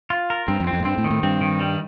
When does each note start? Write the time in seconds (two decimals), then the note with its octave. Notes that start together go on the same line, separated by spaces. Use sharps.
0.10 F4
0.30 A#4
0.48 G2 C4
0.60 F2
0.67 C4
0.73 F2
0.80 A2
0.85 G2 C4
0.98 A2
1.04 D#3
1.10 A2
1.23 G2 C4
1.41 D#3
1.60 G3